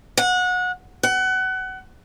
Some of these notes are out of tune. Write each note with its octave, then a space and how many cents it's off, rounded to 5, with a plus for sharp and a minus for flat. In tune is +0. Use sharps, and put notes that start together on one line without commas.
F#5 -25
F#5 +25